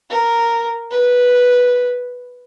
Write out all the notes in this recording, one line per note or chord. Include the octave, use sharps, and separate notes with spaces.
A#4
B4